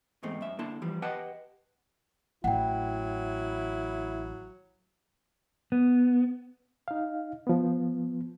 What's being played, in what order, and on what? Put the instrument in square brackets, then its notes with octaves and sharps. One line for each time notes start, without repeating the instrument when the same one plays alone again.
[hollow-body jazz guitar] E2 G#2 A3 C4
F#2 E5
D3 A#3 E4 A5 C6
E3 F3 G3
G4 B4 D#5 F#5 G5 A5
[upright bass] A1 [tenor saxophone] F#3 [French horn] E4 [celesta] F#5 G5
[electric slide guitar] B3
[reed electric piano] D#4 F5
F3 B3